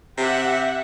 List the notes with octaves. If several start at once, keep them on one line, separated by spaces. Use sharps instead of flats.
C3 G4 E5 F#5